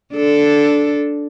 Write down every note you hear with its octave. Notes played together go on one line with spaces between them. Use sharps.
D4 A4